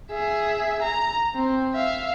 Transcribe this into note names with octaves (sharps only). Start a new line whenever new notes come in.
G#4 E5
A#5
C4
E5 F5